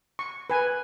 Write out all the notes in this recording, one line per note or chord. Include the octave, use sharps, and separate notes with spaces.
C#6
B4 G#5